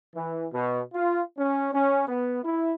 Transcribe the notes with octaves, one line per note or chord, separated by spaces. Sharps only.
E3
B2
F4
C#4
C#4
B3
E4